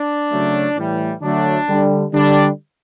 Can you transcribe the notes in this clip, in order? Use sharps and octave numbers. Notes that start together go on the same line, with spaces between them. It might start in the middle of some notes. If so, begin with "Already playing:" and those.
Already playing: D4
C#3 F#3 A3
A2 E3 G3
D3 F#3 A3 D4
D3 G3
D3 G3 D4